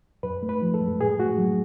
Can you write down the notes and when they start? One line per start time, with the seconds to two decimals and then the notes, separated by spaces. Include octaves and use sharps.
0.23 F#2 B4
0.43 A3
0.49 B4
0.62 F3
0.74 A4
0.81 F#2
1.01 A2 G#4
1.19 A3 F#4
1.38 F#3